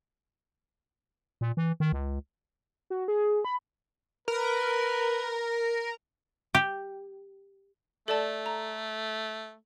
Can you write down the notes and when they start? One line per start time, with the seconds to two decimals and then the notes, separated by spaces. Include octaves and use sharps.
1.41 A#2
1.57 E3
1.80 D#3
1.92 C#2
2.90 F#4
3.08 G#4
3.45 B5
4.28 A#4 B4
6.55 G4
8.08 A3 A4 D5 A5
8.46 A#5